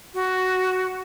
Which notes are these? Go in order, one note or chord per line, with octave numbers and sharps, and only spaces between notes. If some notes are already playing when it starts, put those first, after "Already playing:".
F#4